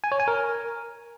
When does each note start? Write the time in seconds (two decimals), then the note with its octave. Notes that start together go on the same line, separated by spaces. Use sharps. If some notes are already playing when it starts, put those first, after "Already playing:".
0.04 G#5
0.12 C#5
0.20 G#5
0.28 A#4